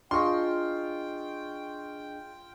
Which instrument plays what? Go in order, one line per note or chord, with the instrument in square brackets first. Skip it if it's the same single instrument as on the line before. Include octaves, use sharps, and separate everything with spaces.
[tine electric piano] D4 G#4 D#5 [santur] F4 [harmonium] G5 [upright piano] C6 C#6